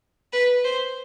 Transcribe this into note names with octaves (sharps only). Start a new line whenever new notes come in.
B4
C5